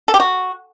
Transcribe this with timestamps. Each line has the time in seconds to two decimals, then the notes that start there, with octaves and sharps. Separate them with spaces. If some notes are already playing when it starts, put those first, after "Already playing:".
0.08 A4
0.14 G4
0.20 F#4